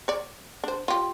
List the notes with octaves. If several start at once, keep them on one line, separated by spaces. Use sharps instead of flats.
C#5 D5
D4 C5
F4 G4